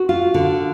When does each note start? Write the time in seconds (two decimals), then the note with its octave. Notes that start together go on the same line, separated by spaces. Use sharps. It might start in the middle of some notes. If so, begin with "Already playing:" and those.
Already playing: F#4
0.09 F4
0.34 D3